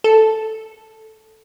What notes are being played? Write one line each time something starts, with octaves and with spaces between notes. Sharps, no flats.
A4